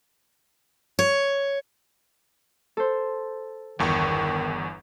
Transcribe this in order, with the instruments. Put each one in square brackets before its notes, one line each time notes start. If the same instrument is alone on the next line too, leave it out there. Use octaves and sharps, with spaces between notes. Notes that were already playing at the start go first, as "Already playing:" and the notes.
[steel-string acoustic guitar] C#5
[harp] A4 C5
[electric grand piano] G1 E2 C#6 [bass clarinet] D#3